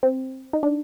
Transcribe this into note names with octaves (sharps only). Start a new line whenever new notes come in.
C4
D#4
D4